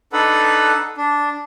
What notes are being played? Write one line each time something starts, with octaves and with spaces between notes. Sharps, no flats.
D4 D#4 A4 B4 F#5
D4